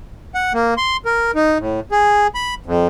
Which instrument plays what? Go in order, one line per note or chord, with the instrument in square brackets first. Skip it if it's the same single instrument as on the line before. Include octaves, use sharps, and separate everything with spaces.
[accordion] F#5
A#3
C6
A#4
D#4
A2
G#4
B5
F2